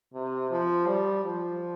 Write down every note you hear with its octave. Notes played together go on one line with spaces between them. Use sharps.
C3
F3
G3
F3